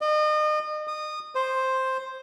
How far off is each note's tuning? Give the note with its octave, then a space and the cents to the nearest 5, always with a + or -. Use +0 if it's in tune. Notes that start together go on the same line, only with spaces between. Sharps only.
D#5 -35
D#6 -20
C5 +5